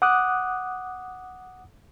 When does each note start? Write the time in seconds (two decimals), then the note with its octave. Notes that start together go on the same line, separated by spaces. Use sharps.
0.02 F#5 D6 D#6 F#6